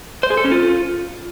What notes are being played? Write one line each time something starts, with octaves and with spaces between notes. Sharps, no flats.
C5
G#4
A4
C#4
F4